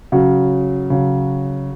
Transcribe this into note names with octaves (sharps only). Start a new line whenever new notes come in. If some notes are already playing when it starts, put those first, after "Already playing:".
C#3 F#3 F#4
C#3 F#3